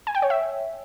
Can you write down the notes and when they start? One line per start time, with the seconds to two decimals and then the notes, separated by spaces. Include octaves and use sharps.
0.07 G#5
0.15 G5
0.22 C#5
0.30 E5